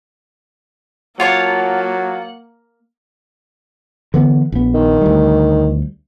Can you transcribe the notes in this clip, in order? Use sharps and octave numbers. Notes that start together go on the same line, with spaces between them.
F#3 A#3 F4 C#5 F#5 A5
D3 E3 B3
A#1 B3
D#3
D2 G3